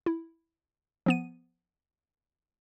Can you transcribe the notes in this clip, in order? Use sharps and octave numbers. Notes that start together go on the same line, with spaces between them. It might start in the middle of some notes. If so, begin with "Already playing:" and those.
E4
F3 B3 D#7